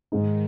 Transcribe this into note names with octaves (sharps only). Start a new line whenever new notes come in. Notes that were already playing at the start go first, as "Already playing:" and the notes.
G#2 D#3 G#3 D#4